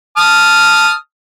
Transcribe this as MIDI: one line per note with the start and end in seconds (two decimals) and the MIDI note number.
0.17 0.92 81
0.17 0.92 87
0.17 0.92 89